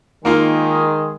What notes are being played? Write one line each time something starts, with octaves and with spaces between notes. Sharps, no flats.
D#3 G#3 A#3 D#4 F4 G#4